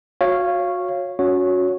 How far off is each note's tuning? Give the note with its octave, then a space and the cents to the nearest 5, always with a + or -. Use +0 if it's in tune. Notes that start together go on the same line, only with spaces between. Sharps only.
F#4 -30 C#5 -10 F5 -15
C#4 +20 F#4 -25 C#5 +5